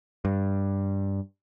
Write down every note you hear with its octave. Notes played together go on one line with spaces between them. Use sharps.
G2